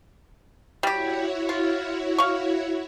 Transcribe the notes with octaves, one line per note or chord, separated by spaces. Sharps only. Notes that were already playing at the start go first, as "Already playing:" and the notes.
G3 E4 F#4 G4 C#5
F4
F5 C#6